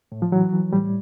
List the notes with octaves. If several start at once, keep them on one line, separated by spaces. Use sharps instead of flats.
A2
F3
E3 F#3
E3
A2 G3